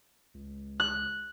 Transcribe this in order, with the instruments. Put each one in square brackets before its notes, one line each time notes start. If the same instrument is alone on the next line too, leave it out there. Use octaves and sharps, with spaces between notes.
[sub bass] C#2
[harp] F#6